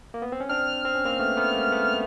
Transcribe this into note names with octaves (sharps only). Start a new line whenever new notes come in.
A#3
B3
C4
C#4
C4 D4 F6
C4
C#4
A#3 C4
A3 B3
A3 B3
G#3 A#3
A3 B3